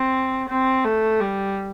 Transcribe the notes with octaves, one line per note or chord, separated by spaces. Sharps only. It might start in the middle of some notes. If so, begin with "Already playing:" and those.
Already playing: C4
C4
A3
G3